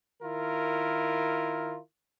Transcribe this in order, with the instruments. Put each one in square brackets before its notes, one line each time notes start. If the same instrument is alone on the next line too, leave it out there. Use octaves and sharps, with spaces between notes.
[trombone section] D#3 E4 F4 A#4